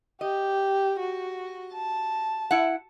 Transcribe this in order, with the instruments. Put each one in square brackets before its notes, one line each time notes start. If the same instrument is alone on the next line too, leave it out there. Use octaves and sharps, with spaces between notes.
[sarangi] G4 [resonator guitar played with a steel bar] D#5
[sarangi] F#4
A5
[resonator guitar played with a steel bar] E4 F#5